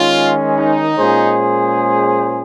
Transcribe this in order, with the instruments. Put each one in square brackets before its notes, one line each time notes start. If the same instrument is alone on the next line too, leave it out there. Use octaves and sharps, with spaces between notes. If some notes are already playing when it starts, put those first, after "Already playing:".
Already playing: [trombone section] D#3 G#3 C#4 [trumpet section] F4
[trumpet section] D#4
[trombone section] A#2 G#3 C#4 G#4 C5